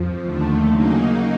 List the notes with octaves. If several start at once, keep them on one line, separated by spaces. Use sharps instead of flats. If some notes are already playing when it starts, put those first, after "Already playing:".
Already playing: F2 F3
D#2 D3 F3 A3
C#3 F#3 A#3 D#4